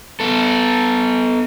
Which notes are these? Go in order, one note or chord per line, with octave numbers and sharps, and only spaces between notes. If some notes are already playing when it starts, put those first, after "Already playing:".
B3 A4